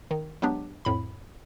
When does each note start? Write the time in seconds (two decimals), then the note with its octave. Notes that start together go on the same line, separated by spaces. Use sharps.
0.11 D#3
0.42 F#3 G#3 B3 D4 G4
0.85 F2 A2 B5